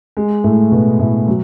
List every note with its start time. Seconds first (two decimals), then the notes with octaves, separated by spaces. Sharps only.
0.17 G#3
0.44 A2 A3
0.71 B2 B3
0.99 A2 A3
1.28 F#3